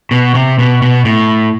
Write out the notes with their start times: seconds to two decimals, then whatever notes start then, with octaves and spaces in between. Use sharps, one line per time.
0.11 B2
0.35 C3
0.59 B2
0.82 B2
1.05 A2